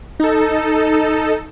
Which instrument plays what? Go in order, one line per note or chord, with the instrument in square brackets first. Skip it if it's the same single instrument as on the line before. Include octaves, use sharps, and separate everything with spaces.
[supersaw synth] D#4 A4